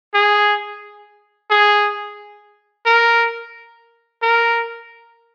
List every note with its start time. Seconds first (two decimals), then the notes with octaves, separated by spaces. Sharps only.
0.14 G#4
1.51 G#4
2.86 A#4
4.22 A#4